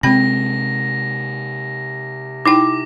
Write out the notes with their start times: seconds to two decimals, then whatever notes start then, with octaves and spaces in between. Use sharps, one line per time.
0.03 C3 G#3 C4 G5 B5 A#6
2.45 D#4 E4 G5 D6